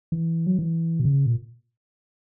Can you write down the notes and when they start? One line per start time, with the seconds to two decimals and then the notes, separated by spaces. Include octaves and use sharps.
0.12 E3
0.47 F#3
0.59 E3
1.00 B2
1.05 C#3
1.26 A#2